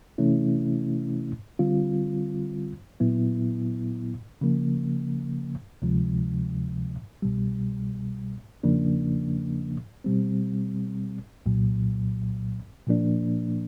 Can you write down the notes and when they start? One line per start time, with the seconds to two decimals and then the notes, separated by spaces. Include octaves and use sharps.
0.18 C3 E3 A3 C#4 E4
1.59 D3 G3 C4 F4
3.00 A#2 F#3 B3 E4
4.41 C#3 F3 A#3
5.82 D2 C3 F3 G#3
7.22 C2 B2 G3
8.63 E2 C#3 F3 A#3 D4
10.04 B2 G3 C4
11.46 C2 A#2 F#3
12.87 A#2 F3 A#3 D4